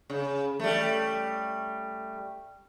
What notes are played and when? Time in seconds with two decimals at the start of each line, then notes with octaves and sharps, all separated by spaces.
0.10 C#3
0.59 G3 A3